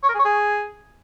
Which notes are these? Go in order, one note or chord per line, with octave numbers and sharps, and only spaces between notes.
C#5
A#4
G#4
C#5
G#4